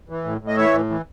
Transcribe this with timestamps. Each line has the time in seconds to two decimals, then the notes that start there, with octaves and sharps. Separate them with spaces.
0.10 E3
0.24 A2
0.41 A2
0.47 D#5
0.57 E3 C#5 E5
0.73 A2
0.90 E3